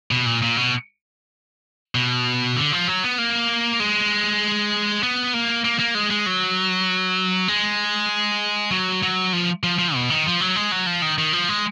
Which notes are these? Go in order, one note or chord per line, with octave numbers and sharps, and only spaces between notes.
B2
A#2
A#2
B2
B2
D3
F3
F#3
B3
A#3
G#3
B3
A#3
A#3
A#3
G#3
G#3
F#3
G#3
F#3
F#3
F3
F3
F3
B2
D#3
F3
F#3
G#3
F#3
F3
D#3
D#3
F3
G#3